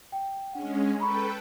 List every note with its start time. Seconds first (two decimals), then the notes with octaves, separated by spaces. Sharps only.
0.12 G5
0.53 G#3 C#4 D4 F#5
1.00 A4 B4 G5 A#5 B5 C#6